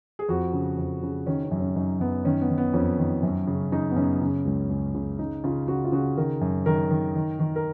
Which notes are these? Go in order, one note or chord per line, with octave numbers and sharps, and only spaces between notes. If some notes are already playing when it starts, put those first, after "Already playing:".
G#4
F2 F#4
C#3
F2
C#3
D#3 C#4
C#4
F#2
C#4
F#2 D#4
F#2 B3
D#3 C#4
B3
D#3
B3
F2 C#4
D#3
F#2
C#3
C#3 D#4
B3
F#2 C#4
C#3
C#2
C#2
C#3
C#3 D#4
C#3 F4
C#3 F#4
F4
C#3 F#4
D#3 A#4
F#2
D#3 A#4
D#3
D#3
D#3
A#4